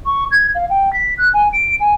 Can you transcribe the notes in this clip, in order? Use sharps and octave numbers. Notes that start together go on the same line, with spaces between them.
C#6
G#6
F5
G5
B6
F#6
G#5
D7
G#5